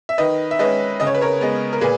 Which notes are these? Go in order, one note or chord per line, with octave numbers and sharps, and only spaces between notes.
E5
D#3 B4 D#5
E5
G#3 C#4 B4 D#5
C#3 D#5
C#5
B4
A#4 C#5
G#3 B3
A#4
A#2 G#4 B4